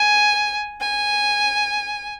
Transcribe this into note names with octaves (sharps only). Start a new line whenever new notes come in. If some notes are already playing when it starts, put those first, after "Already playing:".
Already playing: G#5
G#5